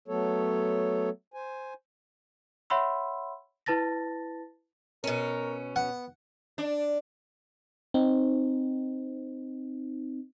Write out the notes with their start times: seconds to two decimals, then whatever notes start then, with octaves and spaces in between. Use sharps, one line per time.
0.08 F#3 A3 B3 A4 C#5
1.34 C5 G#5
2.70 C#5 E5 F#5 B5 C6 E6
3.66 E4 B4 A5 A6 A#6
5.04 B2 C#4 A#4
5.76 B3 F#5
6.58 D4
7.94 C4 D#4